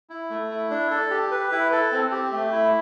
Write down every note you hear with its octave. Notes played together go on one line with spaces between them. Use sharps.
E4
A3
E4
D4
A4
G4
B4
E4
A4
C4
G4
A3
E4